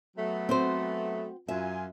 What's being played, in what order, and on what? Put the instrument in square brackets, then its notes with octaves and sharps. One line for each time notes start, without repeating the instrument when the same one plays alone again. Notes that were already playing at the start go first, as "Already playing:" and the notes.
[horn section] F#3 A3 B3
[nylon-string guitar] C4 F#4 C5
[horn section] F#2 F4 G#5 [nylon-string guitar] E5